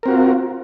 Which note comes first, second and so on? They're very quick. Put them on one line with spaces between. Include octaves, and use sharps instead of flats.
A#4 C4 F#4 F4